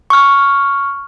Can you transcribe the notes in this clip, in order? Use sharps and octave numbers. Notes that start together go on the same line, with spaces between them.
C#6 F6